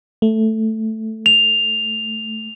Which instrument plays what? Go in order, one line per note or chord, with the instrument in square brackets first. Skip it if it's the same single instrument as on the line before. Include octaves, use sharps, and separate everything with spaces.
[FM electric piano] A3
[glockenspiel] F7